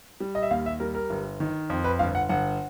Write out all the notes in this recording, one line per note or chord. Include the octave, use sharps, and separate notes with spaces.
G3
D#5
E5
D#2 F5
E5
G3 A#4
A#4
G1
D#3
F2
B4
G1 F5
F#5
G1 F#5